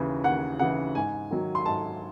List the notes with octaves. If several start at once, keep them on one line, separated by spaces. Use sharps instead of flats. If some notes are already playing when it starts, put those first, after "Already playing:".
Already playing: D#2 C#3 E3
D#2 F#5
C#3 E3 F#5
G#2 G#5
D#3 F#3
C6
G#2 A5